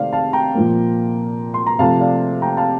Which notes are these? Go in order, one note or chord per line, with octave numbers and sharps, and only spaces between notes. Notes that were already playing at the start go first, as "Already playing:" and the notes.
Already playing: C3 D#3 A3 C5 D5 F5
F5 A5
G5 A#5
A#2 F3 A#3
C6
A#5
C3 F3 A3 F5 A5
D5 F5
G5 A#5
F5 A5